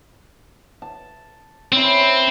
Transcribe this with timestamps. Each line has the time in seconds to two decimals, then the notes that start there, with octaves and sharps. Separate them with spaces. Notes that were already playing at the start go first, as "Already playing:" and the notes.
0.82 A5
1.72 C4 C#4 E4
2.00 C5